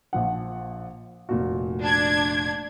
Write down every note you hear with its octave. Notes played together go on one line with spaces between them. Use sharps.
A#1 F3 F#5
F1 A#2 F#4
D4 G#6